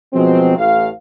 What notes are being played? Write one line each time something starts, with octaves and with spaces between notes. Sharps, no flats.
B2 F3 F#3 G#3 C4
A1 A2 F5